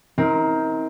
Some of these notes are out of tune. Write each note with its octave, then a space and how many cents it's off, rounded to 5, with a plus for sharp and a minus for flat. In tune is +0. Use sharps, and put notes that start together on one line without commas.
C4 +5 D#4 +45 A#4 +5